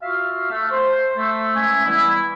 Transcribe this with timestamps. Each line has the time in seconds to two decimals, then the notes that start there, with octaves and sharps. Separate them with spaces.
0.02 F4 F#4 E5 F5
0.51 A3
0.71 C5
1.18 A3
1.56 G#3 A3 C#4 E4 E5 G#5
1.85 E3 G3 B3 E4